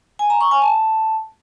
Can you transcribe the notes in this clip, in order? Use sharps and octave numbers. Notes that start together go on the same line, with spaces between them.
G#5
A#5
C#6
G#5
A5